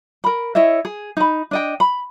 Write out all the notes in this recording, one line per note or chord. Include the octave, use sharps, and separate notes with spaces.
A#4 B5
E4 C#5 D#5 E5
G#4
D#4 B5
D4 D#5 G5
B5